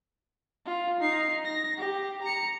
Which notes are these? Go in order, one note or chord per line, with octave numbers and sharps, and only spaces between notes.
F4
D#4 C7
A#6
G4
A#5 C#7